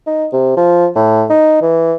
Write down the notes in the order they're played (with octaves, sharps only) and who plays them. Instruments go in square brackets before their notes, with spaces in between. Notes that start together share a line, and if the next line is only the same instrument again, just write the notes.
[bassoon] D#4
C3
F3
A2
D#4
E3